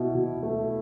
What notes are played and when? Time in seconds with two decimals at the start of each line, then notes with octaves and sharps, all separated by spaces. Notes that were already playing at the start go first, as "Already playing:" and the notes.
Already playing: B2 E4
0.15 B2
0.43 A3